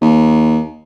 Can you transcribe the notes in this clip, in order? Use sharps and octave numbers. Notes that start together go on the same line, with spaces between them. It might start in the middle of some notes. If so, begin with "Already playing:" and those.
D#2